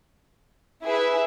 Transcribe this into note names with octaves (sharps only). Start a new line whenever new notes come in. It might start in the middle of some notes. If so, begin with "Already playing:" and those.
E4 G#4 B4 E5